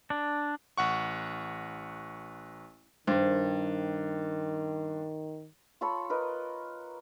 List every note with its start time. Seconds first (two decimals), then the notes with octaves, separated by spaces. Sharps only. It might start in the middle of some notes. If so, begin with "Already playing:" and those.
0.10 D4
0.77 A1 F#5 C#6
3.07 G2 D#3 A#4 C5
5.81 F4 A4 C#5 B5
6.10 A#4 B4 D#5